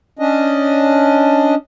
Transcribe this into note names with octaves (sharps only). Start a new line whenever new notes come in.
C#4 D4 D#5